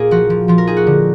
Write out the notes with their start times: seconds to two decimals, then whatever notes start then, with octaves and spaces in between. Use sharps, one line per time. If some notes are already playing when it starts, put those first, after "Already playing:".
Already playing: A#2 A#3 D#4 G#4
0.11 F3 F#4
0.30 F3
0.48 F3 F4
0.58 A#4
0.67 D#4 G#4
0.77 F#4
0.87 D3